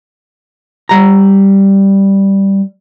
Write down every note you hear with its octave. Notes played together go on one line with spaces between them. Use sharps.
G3 A#5